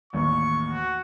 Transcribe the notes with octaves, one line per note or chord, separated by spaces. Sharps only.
A1 D#2 C#6
F#4